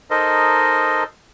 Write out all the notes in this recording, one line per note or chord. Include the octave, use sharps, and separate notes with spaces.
D#4 A4 A#4 C5 D#5